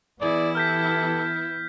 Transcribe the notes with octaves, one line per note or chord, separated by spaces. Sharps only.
E3 B3 E4 G#4 D5
G4 A4 F6 G6 B6